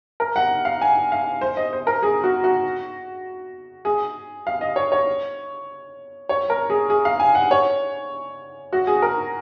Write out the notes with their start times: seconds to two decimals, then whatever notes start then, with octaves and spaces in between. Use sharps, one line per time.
0.20 A#4
0.36 F#5
0.65 F5
0.81 G#5
1.12 F5
1.41 C5
1.57 D#5
1.73 C5
1.87 A#4
2.03 G#4
2.24 F#4
2.44 F#4
3.85 G#4
4.47 F5
4.61 D#5
4.76 C#5
4.92 C#5
6.29 C#5
6.50 A#4
6.70 G#4
6.90 G#4
7.05 F5
7.20 G#5
7.35 F#5
7.51 C#5
8.73 F#4
8.87 G#4
9.02 A#4